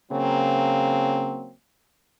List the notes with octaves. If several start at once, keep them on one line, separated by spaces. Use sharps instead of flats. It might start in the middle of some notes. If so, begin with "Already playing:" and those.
C#3 F#3 A#3 C4